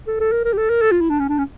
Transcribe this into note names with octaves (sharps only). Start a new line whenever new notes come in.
A4
A4
A#4
A#4
G4
A4
A#4
A4
F4
E4
D4
C#4
D4
C#4